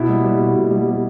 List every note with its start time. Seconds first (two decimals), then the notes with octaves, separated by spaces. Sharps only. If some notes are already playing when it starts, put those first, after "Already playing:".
Already playing: B2 E4
0.09 G3
0.24 G3
0.40 B2
0.56 B2
0.71 G3
0.87 G3